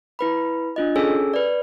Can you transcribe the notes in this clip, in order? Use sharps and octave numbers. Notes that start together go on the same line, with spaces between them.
E4 B4 B5
D4 F4 D#5
C#4 G#4 A4 C#5 G#5 E6
B4 D5